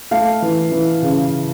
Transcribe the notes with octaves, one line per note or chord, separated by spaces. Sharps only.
A3 F5
E3
E3
C#3